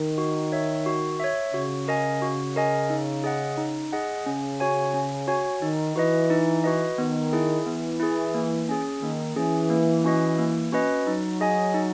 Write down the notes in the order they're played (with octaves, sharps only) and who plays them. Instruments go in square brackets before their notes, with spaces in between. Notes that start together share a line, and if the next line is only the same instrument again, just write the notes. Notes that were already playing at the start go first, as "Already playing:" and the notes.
Already playing: [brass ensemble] D#3
[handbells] F#4
C#5 E5
F#4
C#5 E5
[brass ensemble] C#3 [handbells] F#4
[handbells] A#4 D#5 G#5
F#4
A#4 D#5 G#5
D#4
G#4 D#5 F#5
D#4
G#4 D#5 F#5
[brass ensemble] C#3 [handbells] C#4
[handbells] F#4 C#5 G#5
C#4
F#4 C#5 G#5
[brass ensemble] D#3 [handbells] D#4
[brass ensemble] E3 [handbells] F#4 B4 D#5
[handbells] D#4
F#4 B4 D#5
[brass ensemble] D#3 [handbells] B3
[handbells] E4 G#4
[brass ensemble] E3 [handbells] B3
[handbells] E4 G#4
A#3
C#4 G#4
[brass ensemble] D#3 [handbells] A#3
[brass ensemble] E3 [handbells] C#4 G#4
[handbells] A#3
C#4 F#4 B4 D#5
A#3
C#4 F#4 B4 D#5
[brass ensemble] F#3 [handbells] D#4
[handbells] G#4 D#5 G#5
D#4